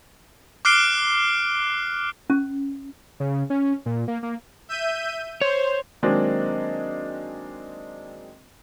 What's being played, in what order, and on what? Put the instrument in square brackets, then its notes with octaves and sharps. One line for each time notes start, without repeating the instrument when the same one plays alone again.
[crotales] D6 F6 F#6 C7 D7 G7
[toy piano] C#4
[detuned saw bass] C#3
C#4
A#2
A#3
A#3
[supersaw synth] E5 G6 D#7
[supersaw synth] C5 [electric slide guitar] C#5
[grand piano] D#3 F#3 G#3 A#3 C4 D4